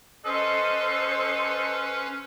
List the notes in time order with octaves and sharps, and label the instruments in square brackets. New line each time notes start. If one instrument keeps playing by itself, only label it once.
[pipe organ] C#4 B4 [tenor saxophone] A4 [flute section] C5 [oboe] D#5